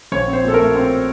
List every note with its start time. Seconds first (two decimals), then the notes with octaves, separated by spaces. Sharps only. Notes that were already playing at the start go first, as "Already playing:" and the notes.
0.12 A#1 C#5
0.28 C4
0.33 C5
0.44 A#2 A4
0.54 A3 A#4
0.75 C4